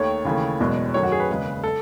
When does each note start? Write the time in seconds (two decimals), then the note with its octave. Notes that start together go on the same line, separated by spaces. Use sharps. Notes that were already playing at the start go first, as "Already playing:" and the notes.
Already playing: D#2 D#3 A3 C#5
0.25 D#2 C#3 E3 A3
0.60 F#1 E2 B2 G#3
0.94 F#2 D#3 F#3 A3 C#5
1.03 F#4
1.12 G#4
1.20 B4
1.29 E1 D#2 C#3 G#3
1.64 A4